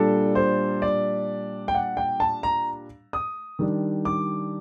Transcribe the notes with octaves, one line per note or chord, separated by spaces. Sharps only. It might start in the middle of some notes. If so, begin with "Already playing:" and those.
Already playing: A#2 G3 D4 A4
C5
D5
G5
F#5
G5
A5
A#5
D#6
D#3 G3 D4
D6